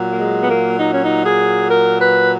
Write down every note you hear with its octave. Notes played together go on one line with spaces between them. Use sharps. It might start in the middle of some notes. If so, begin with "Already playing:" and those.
Already playing: A#2 F#3
A#3
G#3
B3
A#3
D#4
C#4
D#4
G#4
A#4
B4